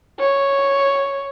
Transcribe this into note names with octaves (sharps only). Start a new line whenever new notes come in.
C#5